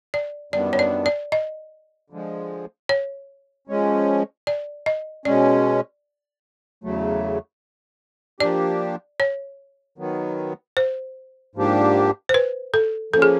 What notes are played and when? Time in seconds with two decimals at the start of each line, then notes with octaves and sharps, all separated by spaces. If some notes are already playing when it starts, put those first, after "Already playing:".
0.14 D5
0.53 F#2 D#3 G3 B3 D4 D5
0.73 C#5
0.79 D5
1.06 D5
1.32 D#5
2.10 D3 F3 G#3
2.89 C#5
3.67 F3 G#3 C#4
4.47 D5
4.86 D#5
5.25 B2 G#3 C#4 D5
6.84 E2 C#3 F#3 A3
8.40 F3 A#3 D4 G4 D5
9.20 C#5
9.98 D#3 F#3 B3
10.77 C5
11.55 G#2 F3 A#3 D4 G4
12.29 C5
12.34 B4
12.74 A4
13.13 F3 A#3 C#4 A4
13.22 G#4